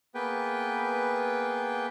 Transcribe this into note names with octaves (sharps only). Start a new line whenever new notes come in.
A#3 B3 G#4 B4 G5